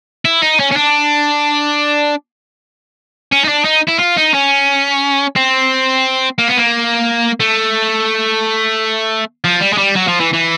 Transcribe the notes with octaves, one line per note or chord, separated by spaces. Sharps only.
E4
D#4
C#4
C#4
D4
C#4
D#4
D4
D#4
E4
F4
D#4
C#4
C4
A#3
B3
A#3
A3
F3
G3
G#3
G3
F#3
F3
E3
E3